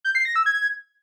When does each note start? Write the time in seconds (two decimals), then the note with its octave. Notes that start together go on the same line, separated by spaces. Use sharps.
0.05 G6
0.15 C7
0.25 A#6
0.36 E6
0.46 G#6